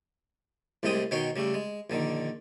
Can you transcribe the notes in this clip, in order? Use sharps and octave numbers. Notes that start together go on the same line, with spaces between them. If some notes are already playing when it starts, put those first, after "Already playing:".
C2 A2 C3 G#3 G5 D#6
B2 D#3 C#5 G5 C6
C#3 G3 A3
G#3
A#1 D3 D#3